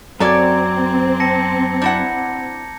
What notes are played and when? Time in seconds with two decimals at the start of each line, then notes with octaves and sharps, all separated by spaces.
0.20 F#2 C4 A4 C#5 D5 A#5 D6 G#6
1.20 A5 A#6 C#7
1.82 D4 E4 F#5 G6 A#6 C#7